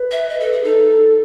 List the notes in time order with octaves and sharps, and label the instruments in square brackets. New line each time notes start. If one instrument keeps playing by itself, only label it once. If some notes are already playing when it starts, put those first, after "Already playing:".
Already playing: [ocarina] B4
[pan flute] E5
D#5
A4
G#4
[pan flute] D#4 [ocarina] A4